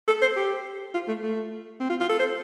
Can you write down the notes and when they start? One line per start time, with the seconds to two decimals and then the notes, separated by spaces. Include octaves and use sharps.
0.08 A4
0.21 C5
0.36 G4
0.94 F4
1.08 A3
1.23 A3
1.80 C4
1.90 F4
2.00 F4
2.09 A4
2.19 C5